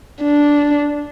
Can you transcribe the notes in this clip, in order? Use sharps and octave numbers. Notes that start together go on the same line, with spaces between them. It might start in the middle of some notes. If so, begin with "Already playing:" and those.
D4